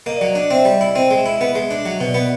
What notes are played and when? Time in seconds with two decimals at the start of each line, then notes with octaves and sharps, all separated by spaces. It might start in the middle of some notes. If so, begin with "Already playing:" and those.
0.06 A#3 D#5
0.17 F#3 D5
0.28 D#5
0.35 D4
0.51 C4 E5
0.65 G3
0.81 E4
0.95 C4 D#5
1.11 G#3
1.18 E5
1.26 E4
1.40 B3 D#5
1.55 G#3
1.71 D4
1.80 E5
1.84 F#3 D#5
2.01 B2
2.07 D5
2.14 B3